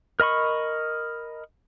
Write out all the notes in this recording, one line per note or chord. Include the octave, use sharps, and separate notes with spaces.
A#4 D#5 B5 C#6